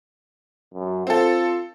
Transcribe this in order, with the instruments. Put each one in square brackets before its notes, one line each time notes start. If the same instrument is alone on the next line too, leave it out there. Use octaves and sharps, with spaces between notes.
[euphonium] F#2
[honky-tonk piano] C4 A4 [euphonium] F4